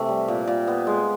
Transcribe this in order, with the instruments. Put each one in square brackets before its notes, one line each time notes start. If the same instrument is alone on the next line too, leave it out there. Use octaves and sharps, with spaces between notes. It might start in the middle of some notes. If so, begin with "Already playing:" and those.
Already playing: [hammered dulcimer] C3 E3 A3
G3
A#2
A#2
B3
G#3